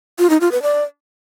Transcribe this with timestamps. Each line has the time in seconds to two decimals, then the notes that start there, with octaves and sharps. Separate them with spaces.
0.19 F4
0.30 D#4
0.41 F4
0.51 B4
0.62 D5